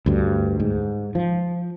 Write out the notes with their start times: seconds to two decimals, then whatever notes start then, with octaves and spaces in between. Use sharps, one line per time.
0.06 D2 G2
0.60 G#2
1.15 F3